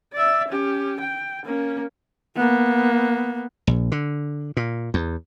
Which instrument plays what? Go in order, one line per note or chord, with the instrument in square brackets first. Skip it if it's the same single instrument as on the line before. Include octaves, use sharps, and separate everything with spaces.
[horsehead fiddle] D5 E5
C#4 G4
G5
A#3 C#4
A#3 B3
[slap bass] A#1
D3
A#2
E2